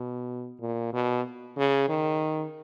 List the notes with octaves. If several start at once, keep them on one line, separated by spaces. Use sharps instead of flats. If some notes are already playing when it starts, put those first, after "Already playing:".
Already playing: B2
A#2
B2
C#3
D#3